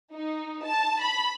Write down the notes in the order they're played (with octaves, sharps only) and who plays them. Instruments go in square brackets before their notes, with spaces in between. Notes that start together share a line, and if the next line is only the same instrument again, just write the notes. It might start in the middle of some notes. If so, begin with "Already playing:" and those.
[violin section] D#4
A5
B5